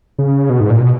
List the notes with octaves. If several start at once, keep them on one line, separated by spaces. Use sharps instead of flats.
C#3
B2
G#2
A#2
B2